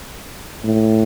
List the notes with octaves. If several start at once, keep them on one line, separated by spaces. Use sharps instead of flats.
A2